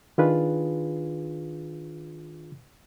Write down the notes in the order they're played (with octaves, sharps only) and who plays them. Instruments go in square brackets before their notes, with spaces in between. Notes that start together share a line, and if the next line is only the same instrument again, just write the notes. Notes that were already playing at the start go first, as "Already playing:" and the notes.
[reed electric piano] D#3 D4 F4 G#4 B4